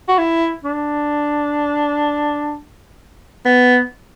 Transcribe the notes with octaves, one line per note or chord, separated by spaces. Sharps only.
F#4
E4
D4
B3